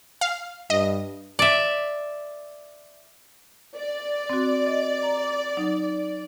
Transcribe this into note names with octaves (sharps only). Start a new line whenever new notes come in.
F5
G2 D#5
D5 E5
D5
C4 F#4
D#5
A#5
F#3 D#4